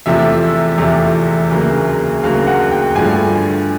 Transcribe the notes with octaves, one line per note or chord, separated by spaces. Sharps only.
E2 C3 F3 A3 C4 E5
E2 C3 F3 A3 C4
D2 C#3 F#3 A#3
D2 C#3 F#3 A#3 F5
F#5
G5
G2 D3 F3 A3 G#5